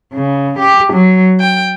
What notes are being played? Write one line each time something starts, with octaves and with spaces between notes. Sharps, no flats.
C#3
G4
F#3
G5